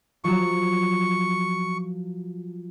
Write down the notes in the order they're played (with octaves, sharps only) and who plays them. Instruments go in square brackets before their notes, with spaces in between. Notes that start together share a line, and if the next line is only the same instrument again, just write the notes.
[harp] F3 F#3 [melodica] C#6